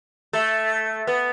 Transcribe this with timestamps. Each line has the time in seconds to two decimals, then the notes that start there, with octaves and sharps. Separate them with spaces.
0.33 A3
1.07 B3